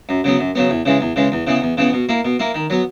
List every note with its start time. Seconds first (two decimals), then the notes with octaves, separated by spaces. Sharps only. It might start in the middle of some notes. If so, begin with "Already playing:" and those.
0.09 F#2
0.24 C#3 F#3 B3
0.39 F#2
0.55 C#3 F#3 B3
0.70 E2
0.85 C#3 E3 G#3
1.01 E2
1.16 C#3 E3 G#3
1.32 E2
1.47 C#3 E3 B3
1.62 E2
1.77 C#3 E3 B3
1.93 B2
2.09 A#3 E4
2.25 B2
2.39 A#3 E4
2.54 D#3
2.70 F#3 B3